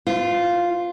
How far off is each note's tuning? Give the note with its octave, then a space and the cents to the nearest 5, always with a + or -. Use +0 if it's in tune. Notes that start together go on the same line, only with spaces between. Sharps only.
F4 +0 C5 -40